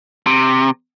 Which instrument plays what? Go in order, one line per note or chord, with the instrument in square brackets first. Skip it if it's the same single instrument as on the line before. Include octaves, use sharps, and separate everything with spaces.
[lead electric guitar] C3